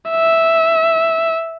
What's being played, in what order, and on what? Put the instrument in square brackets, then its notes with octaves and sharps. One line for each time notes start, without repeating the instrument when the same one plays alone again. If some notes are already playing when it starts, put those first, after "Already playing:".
[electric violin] E5